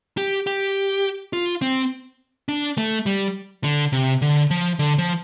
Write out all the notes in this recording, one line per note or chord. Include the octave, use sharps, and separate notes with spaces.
G4
G4
F4
C4
D4
A3
G3
D3
C3
D3
F3
D3
F3